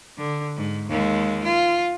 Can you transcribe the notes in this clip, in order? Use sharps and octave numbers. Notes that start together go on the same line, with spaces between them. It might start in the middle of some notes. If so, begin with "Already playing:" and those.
D3
G#2
D#2 G#3
F4